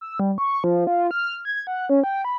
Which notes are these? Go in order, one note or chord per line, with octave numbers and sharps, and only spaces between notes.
E6
G3
C#6
F3
F4
F6
G#6
F#5
C#4
G5
B5